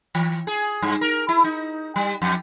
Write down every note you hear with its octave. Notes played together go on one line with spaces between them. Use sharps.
E3
G#4
G2
A#4
E4
D#4
G3
F2